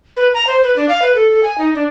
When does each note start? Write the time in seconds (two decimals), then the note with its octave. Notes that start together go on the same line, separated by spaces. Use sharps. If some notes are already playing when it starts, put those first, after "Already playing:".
0.17 B4
0.34 A#5
0.47 C5
0.63 B4
0.76 D4
0.89 F5
1.02 B4
1.15 A4
1.31 A4
1.43 G#5
1.58 D#4
1.75 D4